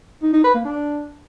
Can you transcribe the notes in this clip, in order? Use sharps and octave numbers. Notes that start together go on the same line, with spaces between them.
D#4
D#4
B4
A#3
D4